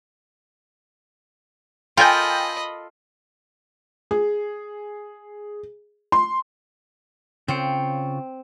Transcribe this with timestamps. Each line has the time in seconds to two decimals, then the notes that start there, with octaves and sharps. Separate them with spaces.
1.97 F4 A4 A#4 D#5 G5 G#5 B5 G6
4.11 G#4
6.12 C6
7.48 C#3 C4 F4 C#5